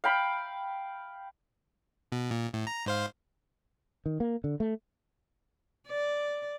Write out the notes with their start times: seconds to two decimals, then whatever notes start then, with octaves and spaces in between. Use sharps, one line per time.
0.04 F5 G5 B5
2.12 B2
2.31 A#2
2.54 A2
2.67 A#5
2.86 G#2 C5 F5
4.06 D#3
4.20 A#3
4.44 D3
4.60 A3
5.87 D5